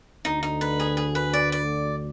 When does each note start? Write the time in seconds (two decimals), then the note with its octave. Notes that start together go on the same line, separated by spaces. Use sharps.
0.25 D2 D3 D#4
0.43 D#4
0.61 B4
0.80 G#4
0.97 G#4
1.15 B4
1.33 D5
1.52 D5